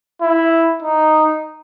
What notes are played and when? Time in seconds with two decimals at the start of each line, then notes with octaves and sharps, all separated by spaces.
0.21 E4
0.82 D#4